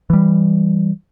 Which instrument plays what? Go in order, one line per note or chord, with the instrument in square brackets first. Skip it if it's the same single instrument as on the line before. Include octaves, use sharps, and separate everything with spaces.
[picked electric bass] E3 G3